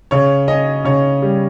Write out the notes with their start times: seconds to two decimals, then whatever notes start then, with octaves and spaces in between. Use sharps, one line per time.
0.11 C#3 C#5
0.48 C#4 D#5
0.85 C#3 C#5
1.22 G3